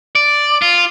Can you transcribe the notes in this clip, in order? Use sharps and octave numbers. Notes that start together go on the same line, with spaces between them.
D5
F4